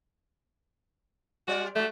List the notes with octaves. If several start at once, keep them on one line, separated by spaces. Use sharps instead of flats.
G3 C4 F#4 D5
G#3 A3 F#4